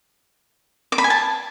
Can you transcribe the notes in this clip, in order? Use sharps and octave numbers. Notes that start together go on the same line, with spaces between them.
D6
B5
G#5
A5